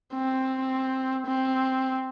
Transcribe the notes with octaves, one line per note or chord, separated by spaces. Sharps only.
C4
C4